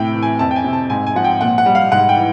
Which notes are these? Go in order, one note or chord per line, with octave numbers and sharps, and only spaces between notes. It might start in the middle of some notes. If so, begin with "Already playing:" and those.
Already playing: A2 C3 G5
E3
G#5
F2 A5
G5
G#5
C3
A5
G#2 G#5
G#5
F3 F#5
G5
A#2 F#5
F#5
G3
F5
G#2 F#5
G5
E3